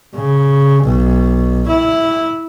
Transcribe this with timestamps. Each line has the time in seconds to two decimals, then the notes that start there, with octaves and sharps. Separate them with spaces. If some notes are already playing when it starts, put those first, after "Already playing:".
0.15 C#3
0.84 B1
1.68 E4